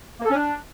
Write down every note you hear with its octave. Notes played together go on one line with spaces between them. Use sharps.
A#3
A4
C#4
D4